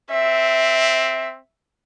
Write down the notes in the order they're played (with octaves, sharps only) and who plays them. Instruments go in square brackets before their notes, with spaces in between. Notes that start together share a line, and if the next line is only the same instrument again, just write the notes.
[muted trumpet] C4 [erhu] E5